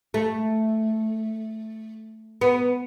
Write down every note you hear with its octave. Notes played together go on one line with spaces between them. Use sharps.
A3
B3